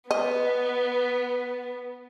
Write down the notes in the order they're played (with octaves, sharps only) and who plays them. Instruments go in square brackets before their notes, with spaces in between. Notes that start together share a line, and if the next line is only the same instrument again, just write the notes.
[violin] B3 [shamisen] D#5